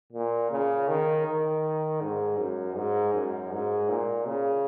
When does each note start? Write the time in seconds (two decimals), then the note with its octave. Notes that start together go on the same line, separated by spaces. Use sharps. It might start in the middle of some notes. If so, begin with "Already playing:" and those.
0.13 A#2
0.51 C#3
0.88 D#3
1.26 D#3
2.01 G#2
2.39 F#2
2.76 G#2
3.14 F#2
3.52 G#2
3.89 A#2
4.27 C#3